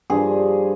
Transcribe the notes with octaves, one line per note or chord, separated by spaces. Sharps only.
G2 F3 G#4